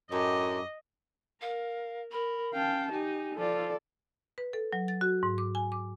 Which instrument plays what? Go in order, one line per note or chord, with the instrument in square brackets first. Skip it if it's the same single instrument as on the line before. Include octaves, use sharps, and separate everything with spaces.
[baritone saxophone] F#2 [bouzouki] A2 D4 G4 [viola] D#5
[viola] A#4 [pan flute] F5
[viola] A#4 [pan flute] B5
[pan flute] C#4 [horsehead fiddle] F5 A5 [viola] G5
[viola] D#4 [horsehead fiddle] G4 [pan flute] G#5
[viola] F3 F4 [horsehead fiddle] A4 D5
[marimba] B4
A4
F#3
A6
F#4
G#2
D6
G#5
D6